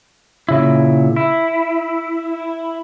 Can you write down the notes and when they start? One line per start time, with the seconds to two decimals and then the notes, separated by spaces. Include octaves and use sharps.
0.49 A#2 C#3 E4
1.16 E4